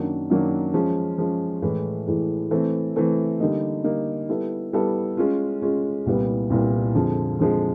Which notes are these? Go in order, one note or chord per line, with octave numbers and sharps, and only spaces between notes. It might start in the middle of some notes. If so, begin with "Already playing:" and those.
Already playing: F#2 D#3 F#3 A#3 D4
F#2 D#3 F#3 A#3 D4
F3 G#3 C#4
F3 G#3 C#4
A2 E3 G#3
A2 E3 G#3
E3 A3 C4
E3 A3 C4
D3 G3 A#3 D#4
D3 G3 A#3 D#4
G3 B3 E4 A4
G3 B3 E4 A4
G#3 C#4 F4
G#3 C#4 F4
C2 A#2 G3 B3 E4
C2 A#2 G3 B3 E4
F2 D3 F3 G#3
F2 D3 F3 G#3